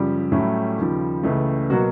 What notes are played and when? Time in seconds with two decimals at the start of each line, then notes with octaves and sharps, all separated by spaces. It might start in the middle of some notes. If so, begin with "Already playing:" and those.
Already playing: F#2 C#3 F3 G3 G4
0.32 A2 F#3 A3 C#4 E4
0.78 D#2 C#3 F3
1.23 C#2 C#3 E3 A3
1.70 B2 F#3 A#3 F#4